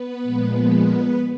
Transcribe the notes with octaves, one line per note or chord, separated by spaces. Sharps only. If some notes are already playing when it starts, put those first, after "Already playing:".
Already playing: B3 B4
A#2 F3 G#3